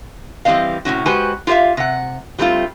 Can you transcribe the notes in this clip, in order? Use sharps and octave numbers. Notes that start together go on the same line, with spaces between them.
E3 G3 C4 C5 D#5 F5
A2 C3 C#4 F#4
G#3 F#4 G4 B4 C5 G#5
F4 G4 C5 E5 F5
C3 F#5
F#3 G3 A3 C4 F4